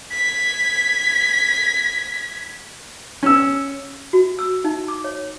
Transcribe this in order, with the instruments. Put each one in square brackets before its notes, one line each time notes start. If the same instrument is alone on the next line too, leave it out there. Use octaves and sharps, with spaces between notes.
[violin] G#6 B6
[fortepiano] C#4 E6
[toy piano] F#4
E6
D#4
D6
C#5